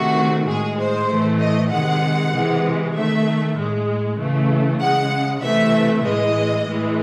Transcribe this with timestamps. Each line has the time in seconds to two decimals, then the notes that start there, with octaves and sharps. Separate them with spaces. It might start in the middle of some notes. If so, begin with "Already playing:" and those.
Already playing: C3 D#3 A3 F#4
0.47 A2 G#3 G#4
0.77 C5
1.09 A2 E3 A3
1.40 D#5
1.71 C3 D#3 G#3 F#5
2.33 C3 E3 G#3
2.94 D#3 A3 E5
3.56 A2 G#3
4.17 C#3 E3 A3
4.79 C#3 G#3 F#5
5.41 C3 E3 A3 E5
6.03 A2 E3 G#3 D#5
6.66 A2 E3 G#3